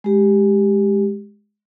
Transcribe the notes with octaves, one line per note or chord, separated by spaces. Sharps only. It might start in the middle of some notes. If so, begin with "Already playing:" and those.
G#3 G4